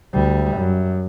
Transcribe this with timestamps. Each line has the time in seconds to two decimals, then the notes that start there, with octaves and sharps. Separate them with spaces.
0.14 D2 G3
0.58 F#2